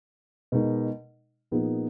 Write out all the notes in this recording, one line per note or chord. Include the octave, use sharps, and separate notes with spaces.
B2 G#3 D#4 A#4
A#2 F3 B3 D#4 G#4